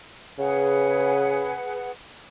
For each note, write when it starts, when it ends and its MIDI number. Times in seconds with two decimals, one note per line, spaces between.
0.39 1.55 49
0.39 1.91 68
0.39 1.91 71
0.39 1.91 78